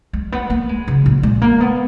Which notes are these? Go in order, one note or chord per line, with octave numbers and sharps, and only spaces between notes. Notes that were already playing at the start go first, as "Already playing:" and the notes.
G#3
B3
A#3
G#3
C#3
A#2
G#3
A#3
B3